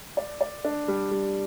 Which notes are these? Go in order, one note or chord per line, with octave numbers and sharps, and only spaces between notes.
D5
D5
D4
G3
G3